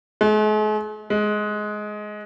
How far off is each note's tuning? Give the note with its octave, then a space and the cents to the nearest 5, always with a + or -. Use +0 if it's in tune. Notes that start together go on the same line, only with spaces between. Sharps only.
G#3 +45
G#3 +15